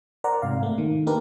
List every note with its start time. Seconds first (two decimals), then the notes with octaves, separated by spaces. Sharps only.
0.24 A#4 C5 D5 F#5 A#5
0.42 G#2 C3 F5
0.63 A3 A#3
0.78 D#3
1.07 A#3 D4 G4 A#4 B4 D5